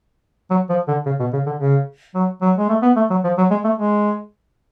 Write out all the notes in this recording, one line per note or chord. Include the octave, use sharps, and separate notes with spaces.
F#3
F3
D3
C#3
B2
C#3
D3
C#3
F#3
F#3
G#3
A3
B3
A3
F#3
F3
F#3
G#3
A3
G#3